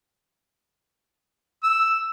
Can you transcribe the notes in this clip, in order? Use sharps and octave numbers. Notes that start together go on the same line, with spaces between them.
E6